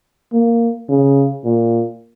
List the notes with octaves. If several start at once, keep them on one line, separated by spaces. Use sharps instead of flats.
A#3
C#3
A#2